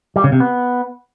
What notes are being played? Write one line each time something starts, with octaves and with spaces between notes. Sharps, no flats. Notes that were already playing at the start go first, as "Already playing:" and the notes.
G3
C#3
C3
B3